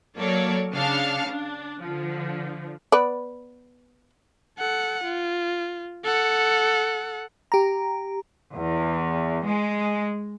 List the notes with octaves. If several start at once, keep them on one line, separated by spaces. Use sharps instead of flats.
F#3 A#3 A4 C#5 D5
C#3 D4 F5 A5 F6 C#7
D4
D3 F3
B3 B4 D5
A4 F#5
F4
A4 F#5
G4 A#5
E2
G#3